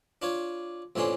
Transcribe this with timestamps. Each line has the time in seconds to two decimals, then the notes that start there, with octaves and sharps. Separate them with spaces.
0.22 D4 F4 C#5
0.96 F2 A2 E3 C#4 D4 C6